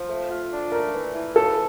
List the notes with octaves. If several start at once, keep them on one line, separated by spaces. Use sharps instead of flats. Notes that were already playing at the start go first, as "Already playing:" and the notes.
Already playing: F3
A3
F4
D4
A3 A#4
E3
E3
C#3 A4